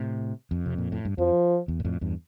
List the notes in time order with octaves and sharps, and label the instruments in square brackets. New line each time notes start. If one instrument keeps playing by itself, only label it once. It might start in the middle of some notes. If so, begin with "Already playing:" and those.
Already playing: [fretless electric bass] A2 C3
F2
C3
A#2
A2
G2
[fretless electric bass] F2 [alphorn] F3
[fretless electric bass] E2
A#2
F2 A2
E2 G2